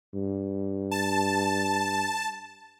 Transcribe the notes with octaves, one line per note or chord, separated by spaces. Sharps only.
G2
A5